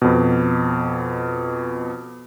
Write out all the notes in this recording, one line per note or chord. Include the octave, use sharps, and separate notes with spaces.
F2 B2